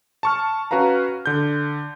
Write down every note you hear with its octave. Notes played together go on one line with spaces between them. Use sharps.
A5 C#6 F6
C#4 F#4 B4 F5 A#5
D3 G6